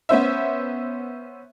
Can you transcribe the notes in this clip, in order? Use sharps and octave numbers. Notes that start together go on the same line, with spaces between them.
B3 C#4 C5 E5